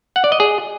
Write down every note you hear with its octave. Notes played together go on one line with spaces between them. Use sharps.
F#5
D5
D#5
G#4